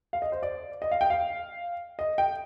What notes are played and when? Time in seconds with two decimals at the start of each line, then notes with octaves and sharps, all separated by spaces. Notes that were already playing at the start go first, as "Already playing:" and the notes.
0.13 F5
0.22 D#5
0.32 C5
0.43 D5
0.82 D#5
0.91 F5
1.01 G5
1.10 F5
1.99 D#5
2.18 G5